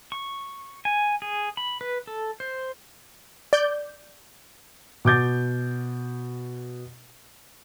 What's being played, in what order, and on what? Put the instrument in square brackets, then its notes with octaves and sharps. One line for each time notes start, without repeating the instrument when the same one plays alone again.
[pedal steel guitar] C#6
G#5
G#4
B5
B4
A4
C5
[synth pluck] D5 G6
[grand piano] B2 D6 G6 A6